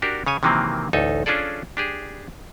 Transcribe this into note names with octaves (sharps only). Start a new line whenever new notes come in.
D4 F#4 G4 A#4
C#3 C#5 G#5
C3 D#3 E3 F#3 A#3 C4
A1 D2 D#4 A4 G#5
C#4 D4 F4 G#4 A4 D5
D4 G4 G#4